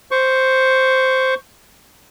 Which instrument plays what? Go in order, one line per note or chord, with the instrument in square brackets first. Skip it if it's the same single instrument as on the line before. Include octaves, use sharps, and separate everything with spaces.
[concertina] C5 C#6